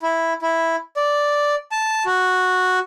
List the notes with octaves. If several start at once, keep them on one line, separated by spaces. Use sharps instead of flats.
E4
E4
D5
A5
F#4